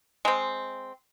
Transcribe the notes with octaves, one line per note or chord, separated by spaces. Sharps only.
G#3 C4